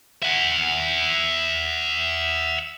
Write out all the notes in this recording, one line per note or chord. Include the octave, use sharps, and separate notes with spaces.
E5 F#5